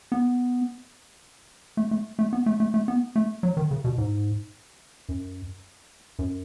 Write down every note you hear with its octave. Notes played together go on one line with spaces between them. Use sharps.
B3
A3
A3
A3
B3
A3
A3
A3
B3
A3
F#3
D#3
C#3
B2
G#2
F#2
F#2